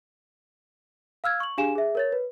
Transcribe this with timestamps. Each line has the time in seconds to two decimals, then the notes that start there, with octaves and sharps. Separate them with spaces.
1.24 F5 E6 F6 G#6
1.40 C#6 F#7
1.58 D4 G4 G#4 F5 G#5 E7
1.75 G#4 E5
1.95 A#4 C#5 A6
2.12 B4